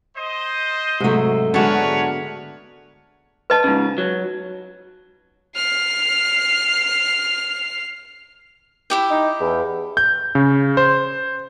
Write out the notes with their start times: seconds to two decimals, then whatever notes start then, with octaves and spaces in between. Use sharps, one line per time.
0.16 C5 D#5
1.00 G#2 C3 F#3 A3
1.54 D3 G#3 B3 D4 F#4 A#4 B4 C#5
3.50 B4 D#5 A5
3.64 G#2 C#3
3.98 F#3
5.56 F6 C7
8.90 E4 G4 G5
9.11 D#4
9.40 E2
9.97 G6
10.35 C#3
10.77 C5